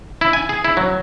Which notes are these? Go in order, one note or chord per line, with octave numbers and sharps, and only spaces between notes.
E4
G#5
G#4
E4
F#3